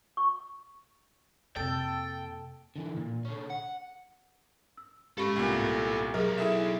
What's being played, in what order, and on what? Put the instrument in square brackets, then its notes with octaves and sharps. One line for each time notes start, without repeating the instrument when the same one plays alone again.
[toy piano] C#6
[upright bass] F2 A#3 [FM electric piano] C3 E6 A6 [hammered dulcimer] A4 [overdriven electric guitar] G5
[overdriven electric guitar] D3 E3
A#2
D3 C#4
F#5
[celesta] E6
[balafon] G#3 C#4 C#6 [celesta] G4 [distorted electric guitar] A4 B5
[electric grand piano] C2 A#2 [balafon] B3 C#4
[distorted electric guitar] B1 [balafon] F#3 G#4 [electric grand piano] A#4
[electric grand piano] E4 G#4 E5 [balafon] A4